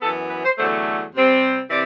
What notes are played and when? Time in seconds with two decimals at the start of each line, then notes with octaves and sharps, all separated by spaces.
0.01 F#2 E3 B3 A4
0.29 B4
0.44 C5
0.57 E2 D3 F#3 A3 C5
1.14 C3 G3 C4
1.70 C3 E3 D5